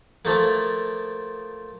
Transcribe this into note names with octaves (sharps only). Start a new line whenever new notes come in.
F3 A3 A#3